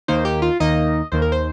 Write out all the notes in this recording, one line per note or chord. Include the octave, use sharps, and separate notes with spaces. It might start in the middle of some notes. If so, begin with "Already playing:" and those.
D#2 D#3 A#3 D#4 C5
G4
F4
D#2 D#3 A#3 D#4 D#5
D#2 D#3 A#3 C5
A#4
C5